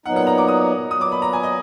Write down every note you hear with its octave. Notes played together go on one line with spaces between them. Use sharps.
A#2 F#3 B3 D#4 F#5
F#5
A#5
D6
D#6
A#2 F#3 B3 D#6
D6
B5
A#5
G#5
D#5